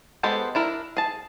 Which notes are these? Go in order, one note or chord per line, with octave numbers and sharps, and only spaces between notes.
G#3 B3 G4 A4 C5
D4 E4 A#4
G#4 A5